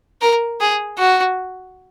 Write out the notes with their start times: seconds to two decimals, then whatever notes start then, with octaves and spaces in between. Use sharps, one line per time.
0.22 A#4
0.61 G#4
0.98 F#4